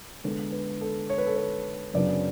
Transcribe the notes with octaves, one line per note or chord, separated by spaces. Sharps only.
D3 G#3 B3 A4
B4
A4
C#5
B4
A4
B4
F#2 C#3 F#3 B3 D4 D5